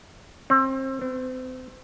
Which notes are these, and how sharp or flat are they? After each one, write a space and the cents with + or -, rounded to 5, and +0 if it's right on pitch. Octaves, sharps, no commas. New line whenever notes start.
C4 +30
C4 -35